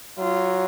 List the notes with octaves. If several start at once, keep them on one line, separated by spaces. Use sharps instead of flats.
F#3 F4